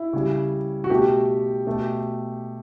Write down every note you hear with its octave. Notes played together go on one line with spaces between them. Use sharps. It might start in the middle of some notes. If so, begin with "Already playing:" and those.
Already playing: E4
C#3 G3
F#4
B2 A3 G4
B2 A3